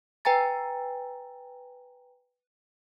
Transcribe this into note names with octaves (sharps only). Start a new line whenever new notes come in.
B4 G5 G#5 A#5 A6